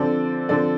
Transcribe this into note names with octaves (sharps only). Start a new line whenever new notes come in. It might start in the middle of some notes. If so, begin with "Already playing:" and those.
Already playing: D3 F3 C4 A4 D5
D3 F3 C4 A4 D5